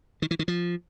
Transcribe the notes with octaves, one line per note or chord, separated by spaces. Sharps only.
D#3
E3
D#3
F3